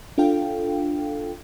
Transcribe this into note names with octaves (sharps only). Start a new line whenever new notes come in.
D4 F4 A4 F5 G5